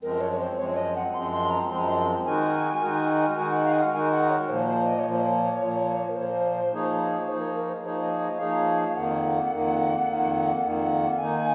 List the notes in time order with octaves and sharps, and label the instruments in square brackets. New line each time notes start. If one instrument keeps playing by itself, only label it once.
[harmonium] F#2 F3 G#3 C4 [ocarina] A#4
[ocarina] C#5
C#5
C5
[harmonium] F#2 F3 G#3 C4 [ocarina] C#5
[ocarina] C#5
D#5
F#5
[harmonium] F#2 F3 G#3 C4 [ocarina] C6
[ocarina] C6
A#5
[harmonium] F#2 F3 G#3 C4 [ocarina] C6
[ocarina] A#5
C6
[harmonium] D#3 G#3 D#4 F#4 A#4 [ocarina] G#5
[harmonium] D#3 G#3 D#4 F#4 A#4
[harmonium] D#3 G#3 D#4 F#4 A#4 [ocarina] G#5
[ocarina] F#5
F5
G#5
F#5
[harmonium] D#3 G#3 D#4 F#4 A#4 [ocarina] G#5
[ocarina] F#5
C#5
[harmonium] A#2 F3 A#3 [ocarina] C5
[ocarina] C5
D#5
C#5
[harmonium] A#2 F3 A#3
[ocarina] C5
C#5
[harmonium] A#2 F3 A#3
[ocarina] A#4
[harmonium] A#2 F3 A#3 [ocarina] C5
[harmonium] F3 A#3 D#4 G#4 C#5
[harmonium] F3 A#3 D#4 G#4 C#5 [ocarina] C5
[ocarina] A#4
A#4
C5
[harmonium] F3 A#3 D#4 G#4 C#5 [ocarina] C5
[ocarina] D#5
D#5
[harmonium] F3 A#3 D#4 G#4 C#5 [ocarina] F5
[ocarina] F5
[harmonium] F2 D#3 A#3 [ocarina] F#5
[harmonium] F2 D#3 A#3
F2 D#3 A#3
F2 D#3 A#3
[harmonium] D#3 A#3 D#4 [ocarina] G#5